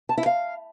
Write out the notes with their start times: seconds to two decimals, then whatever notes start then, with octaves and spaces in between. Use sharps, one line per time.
0.09 A5
0.18 E4
0.26 F5